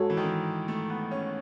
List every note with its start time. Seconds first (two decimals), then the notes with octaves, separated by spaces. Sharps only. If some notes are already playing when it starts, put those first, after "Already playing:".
Already playing: G#2 F#4 A4 C#5
0.10 E3
0.17 D#3
0.24 E3
0.68 A3
0.90 B3
1.11 C#4